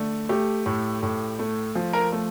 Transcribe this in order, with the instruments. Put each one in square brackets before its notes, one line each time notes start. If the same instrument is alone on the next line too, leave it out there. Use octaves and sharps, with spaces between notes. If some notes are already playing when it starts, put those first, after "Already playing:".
Already playing: [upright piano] D3 A3
A3 G4
A2
A2
A3
F3
A#4
A3